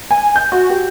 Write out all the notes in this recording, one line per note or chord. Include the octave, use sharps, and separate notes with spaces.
G#5
G6
F#4
G4